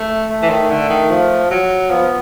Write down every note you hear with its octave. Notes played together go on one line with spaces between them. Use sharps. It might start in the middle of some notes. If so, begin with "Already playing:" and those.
Already playing: A3
A3
E3
D#3
D3
D#3
F3
F#3
F3 B3